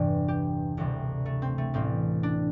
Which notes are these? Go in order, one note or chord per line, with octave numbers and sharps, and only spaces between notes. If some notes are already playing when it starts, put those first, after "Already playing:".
Already playing: G1 E2 G2 C3 E3 G3
G4
E1 D2 C3 G3
A3
C4
A3
A1 A2 G3 C4
D4